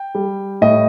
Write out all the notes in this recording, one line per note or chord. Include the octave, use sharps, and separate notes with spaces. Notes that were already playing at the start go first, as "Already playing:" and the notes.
Already playing: G5
G3
A2 D#5